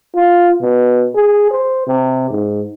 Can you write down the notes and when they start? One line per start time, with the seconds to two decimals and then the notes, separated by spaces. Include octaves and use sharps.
0.15 F4
0.62 B2
1.15 G#4
1.51 C5
1.87 C3
2.30 G#2